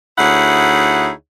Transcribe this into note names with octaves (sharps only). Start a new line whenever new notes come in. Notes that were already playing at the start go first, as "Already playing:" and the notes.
D2 D#4 E4 G#4 C#5 F#5